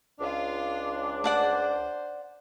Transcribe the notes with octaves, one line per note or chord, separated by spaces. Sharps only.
C#2 D4 F4 F5
C5 D5 F#5 A5